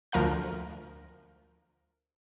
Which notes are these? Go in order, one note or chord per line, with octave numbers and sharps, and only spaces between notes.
D2 F3 A#4 F5 F#6